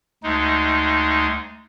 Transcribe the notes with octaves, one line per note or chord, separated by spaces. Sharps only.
D2 G#3 D#4